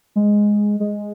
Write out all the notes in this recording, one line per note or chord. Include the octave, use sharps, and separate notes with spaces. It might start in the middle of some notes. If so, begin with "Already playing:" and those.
G#3
G#3